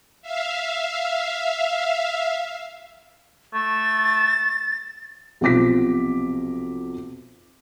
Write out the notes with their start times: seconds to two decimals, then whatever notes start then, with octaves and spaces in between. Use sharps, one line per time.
0.22 E5 F5
3.54 A3 A6
5.41 B1 C3 F3 D6 A#6 B6